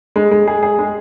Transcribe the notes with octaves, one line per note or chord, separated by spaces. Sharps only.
G#3
G#3
G#4
G#4
G#3